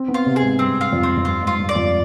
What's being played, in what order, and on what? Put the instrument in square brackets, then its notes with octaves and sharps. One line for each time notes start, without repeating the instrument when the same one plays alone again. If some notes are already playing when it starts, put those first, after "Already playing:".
Already playing: [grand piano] C4
B3
[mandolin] F4
[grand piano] C3
[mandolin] G#4
[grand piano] G#2
[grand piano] G2 [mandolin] C4
[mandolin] F4
[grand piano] F2
[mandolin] C4
[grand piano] F2
[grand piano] G2 [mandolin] F4
[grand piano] G#2
[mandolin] F4
[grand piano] G2
[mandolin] D5
[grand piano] F2